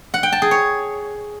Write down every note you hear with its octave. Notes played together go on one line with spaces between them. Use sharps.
F#5
G5
A5
G#4
C#5